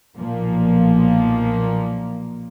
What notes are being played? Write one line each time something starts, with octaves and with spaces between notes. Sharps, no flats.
B1 A#2 F3 A#3